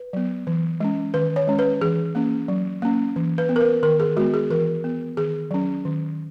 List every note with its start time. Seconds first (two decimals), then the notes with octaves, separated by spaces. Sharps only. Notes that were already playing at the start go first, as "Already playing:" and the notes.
Already playing: B4
0.13 F#3 B3
0.47 E3
0.80 G#3 C#4
1.14 D#3 B4
1.36 C#5
1.47 G#3 C#4
1.59 B4
1.81 E3 G#4
2.15 A#3 C#4
2.48 F#3
2.82 A#3 C#4
3.16 E3
3.38 B4
3.49 B3
3.56 A#4
3.60 B4
3.83 D#3 A#4
4.00 G#4
4.17 G#3 B3 F#4
4.34 G#4
4.50 E3 A#4
4.84 B3
5.17 D#3 G#4
5.51 F#3 C#4
5.85 D#3